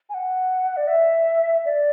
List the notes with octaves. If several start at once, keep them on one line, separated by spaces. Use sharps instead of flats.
G#5
F#5
D5
E5
D5